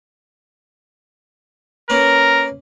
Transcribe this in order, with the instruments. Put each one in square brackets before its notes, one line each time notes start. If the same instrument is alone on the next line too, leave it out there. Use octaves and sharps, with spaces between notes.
[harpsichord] A#3 C#4 B4 [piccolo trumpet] A#4